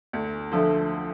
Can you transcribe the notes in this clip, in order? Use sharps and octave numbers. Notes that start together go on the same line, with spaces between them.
D2
D3 F3 A3